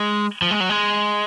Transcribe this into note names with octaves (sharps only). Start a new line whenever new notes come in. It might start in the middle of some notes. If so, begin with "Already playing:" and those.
Already playing: G#3
F3
G#3
F#3
G#3